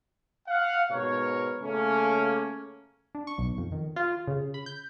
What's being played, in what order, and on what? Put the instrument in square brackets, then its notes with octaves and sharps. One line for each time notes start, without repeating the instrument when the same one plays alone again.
[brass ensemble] F5 F#5
G#2 B2 A#4 C#5
C#3 A3 A#3 C#4
[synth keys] D4
C#6
B1
F2
D#3
F4
C#3
B5
G6